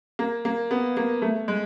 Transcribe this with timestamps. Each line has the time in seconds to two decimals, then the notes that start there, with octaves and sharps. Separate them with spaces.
0.19 A#3
0.45 A#3
0.71 B3
0.97 A#3
1.22 A3
1.48 G#3